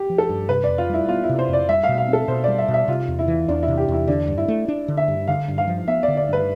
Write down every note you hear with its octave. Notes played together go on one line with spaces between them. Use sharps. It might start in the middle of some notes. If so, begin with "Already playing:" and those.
Already playing: G4
F3
A4
G2
C3 B4
F2 D5
F4
G3 E4
B3 F4
E4
C3
C5
F2 D5
G3 E5
B2 F5
F5
C4 A4
B2 C5
G3 D5
E5
B2
E5
C3 F4
E2
E4
E3
E2 D4
E4
C3
G4
E2 E4
D3 D4
G2
E4
A3
D4
D3
E5
G2
D3 F5
G2
F5
F3
B3 E5
D5
D3
D5
G2 B4